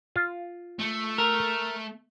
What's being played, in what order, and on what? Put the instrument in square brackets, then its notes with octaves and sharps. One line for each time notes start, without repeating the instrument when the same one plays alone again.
[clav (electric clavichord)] F4
[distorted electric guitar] A3
[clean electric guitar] A#4